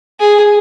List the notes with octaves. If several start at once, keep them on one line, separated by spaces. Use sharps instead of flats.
G#4